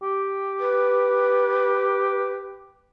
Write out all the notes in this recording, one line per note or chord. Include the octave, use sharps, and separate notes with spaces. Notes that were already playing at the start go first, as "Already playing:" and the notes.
G4
B4